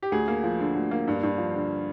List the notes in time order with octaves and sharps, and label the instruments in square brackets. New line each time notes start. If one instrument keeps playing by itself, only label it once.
[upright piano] G4
D2 G#4
A#3
F3
D3
D2
A#3
G2
G2
F3
D3